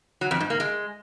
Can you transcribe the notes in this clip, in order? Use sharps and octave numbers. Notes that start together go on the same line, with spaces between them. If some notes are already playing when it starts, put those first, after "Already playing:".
F#3
F2
G#2
A#3
G#3